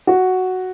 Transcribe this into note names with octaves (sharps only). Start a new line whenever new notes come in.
F#4